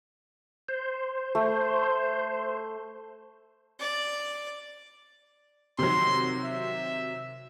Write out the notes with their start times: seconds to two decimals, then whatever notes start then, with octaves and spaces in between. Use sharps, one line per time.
0.69 C5
1.35 A3
3.80 D5
5.79 C3 D#3 F#3 C6
6.44 E5